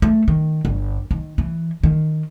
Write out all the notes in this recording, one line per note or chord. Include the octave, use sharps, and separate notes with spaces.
A3
D#3
G1
D#3
E3
D#3